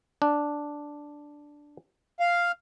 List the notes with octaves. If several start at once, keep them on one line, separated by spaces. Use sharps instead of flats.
D4
F5